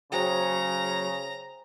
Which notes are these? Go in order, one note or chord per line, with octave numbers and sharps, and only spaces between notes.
C#3 F#3 G#4 C5 G5 A#5